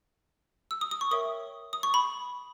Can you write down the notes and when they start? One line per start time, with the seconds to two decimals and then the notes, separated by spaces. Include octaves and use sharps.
0.71 E6
0.81 D#6
0.91 D#6
1.01 C#6
1.11 A#4 C#5 E5 G5 D#6
1.73 D#6
1.83 C#6
1.94 B5